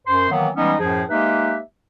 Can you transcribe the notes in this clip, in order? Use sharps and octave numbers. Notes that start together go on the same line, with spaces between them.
F#2 C5 C6
D#3 E3 F#3 A#3 B3
E3 G3 G#3 B3 C#4 D#4
F#2 A2 F3 G#4
G#3 A#3 D#4 G4 B4 E5